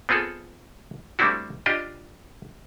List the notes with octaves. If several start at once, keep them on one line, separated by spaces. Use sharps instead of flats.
B3 C4 F4 G#4 A4
G3 A3 C4 D4 E4 F#4
D4 F4 G4 D#5